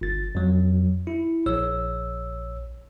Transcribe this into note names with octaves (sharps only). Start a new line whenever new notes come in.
G1 A6
F2 F#3
E4
A#1 C#5 E6